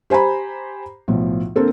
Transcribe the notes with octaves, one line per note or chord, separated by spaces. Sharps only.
G4 C5 G#5 A#5 B5
B1 A2 F3
D3 A#3 C4 A4 C5